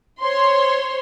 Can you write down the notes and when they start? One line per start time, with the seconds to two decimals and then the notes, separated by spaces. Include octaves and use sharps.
0.23 C5 C#5 C6